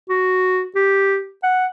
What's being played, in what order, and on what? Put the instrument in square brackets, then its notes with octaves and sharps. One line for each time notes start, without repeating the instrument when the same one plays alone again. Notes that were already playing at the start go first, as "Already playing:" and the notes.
[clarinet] F#4
G4
F#5